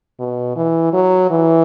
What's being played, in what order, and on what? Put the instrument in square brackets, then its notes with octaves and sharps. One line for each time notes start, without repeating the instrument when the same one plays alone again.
[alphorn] B2
E3
F#3
E3